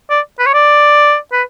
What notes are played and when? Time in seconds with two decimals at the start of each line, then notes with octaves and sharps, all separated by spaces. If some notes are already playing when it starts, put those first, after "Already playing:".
0.10 D5
0.39 B4
0.46 C#5
0.53 D5
1.32 B4